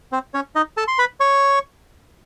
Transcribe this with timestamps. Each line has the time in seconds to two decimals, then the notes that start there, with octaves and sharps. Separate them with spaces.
0.12 C4 C5
0.34 C#4 C#5
0.55 D#4 D#5
0.77 A4 A5
0.88 C6
0.98 B4 B5
1.20 C#5 C#6